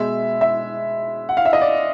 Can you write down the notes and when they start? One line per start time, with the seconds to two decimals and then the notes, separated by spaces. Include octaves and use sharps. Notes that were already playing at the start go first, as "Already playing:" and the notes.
Already playing: B2 G#3 E5
0.41 E5
1.29 F#5
1.37 F5
1.45 E5
1.53 D#5
1.61 D5